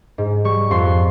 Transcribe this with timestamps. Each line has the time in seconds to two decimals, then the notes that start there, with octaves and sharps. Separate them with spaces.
0.18 G#2
0.44 G3 C#6
0.70 F2 C6